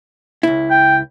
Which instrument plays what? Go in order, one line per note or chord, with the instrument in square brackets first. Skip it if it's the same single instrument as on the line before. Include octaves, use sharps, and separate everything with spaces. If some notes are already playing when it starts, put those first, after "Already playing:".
[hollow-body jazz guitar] C#2 E4
[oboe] G5